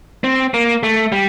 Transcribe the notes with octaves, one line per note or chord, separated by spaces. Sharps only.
C4
A#3
A3
G3